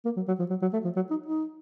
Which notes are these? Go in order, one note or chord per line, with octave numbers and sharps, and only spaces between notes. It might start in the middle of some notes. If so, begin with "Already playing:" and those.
A#3
F#3
F#3
F3
F#3
F#3
A3
F3
F#3
D#4
D#4